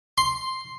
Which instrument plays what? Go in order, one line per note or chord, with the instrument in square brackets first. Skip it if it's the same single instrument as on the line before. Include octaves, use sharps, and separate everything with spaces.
[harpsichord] C6